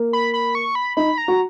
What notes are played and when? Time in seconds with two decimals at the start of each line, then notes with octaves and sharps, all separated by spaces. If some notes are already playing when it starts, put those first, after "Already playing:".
Already playing: A#3
0.13 B5
0.34 B5
0.55 C#6
0.75 B5
0.97 D#4 B5
1.18 A#5
1.28 F#4